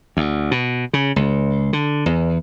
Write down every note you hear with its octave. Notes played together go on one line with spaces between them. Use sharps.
D2
B2
C#3
C#2
D3
E2